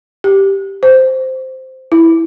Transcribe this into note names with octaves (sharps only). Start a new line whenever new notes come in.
G4
C5
E4